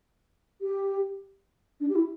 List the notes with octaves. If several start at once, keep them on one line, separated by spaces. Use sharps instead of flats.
G4
D4
G4
E4